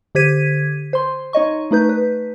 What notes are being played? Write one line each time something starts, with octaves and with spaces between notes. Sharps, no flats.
D3 G4 C5 G#6 B6 D#7
C5 C6
D#4 C#5 D#5 C#6
A3 D#4 B4 G6
B4